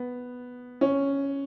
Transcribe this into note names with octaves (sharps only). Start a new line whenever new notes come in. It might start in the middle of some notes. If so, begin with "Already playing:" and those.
Already playing: B3
C#4